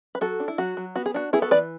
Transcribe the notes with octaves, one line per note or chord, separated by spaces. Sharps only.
B4
F#3 F#4 A4
D4
E4
F#3 F#4
F#3
B3 F#4
G#4
D4 F#4
B3 E4 G#4
F#4 A4
E3 B4 D5